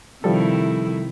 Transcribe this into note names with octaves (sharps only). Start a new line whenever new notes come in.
C3 D#3 F3 G3 E4 A4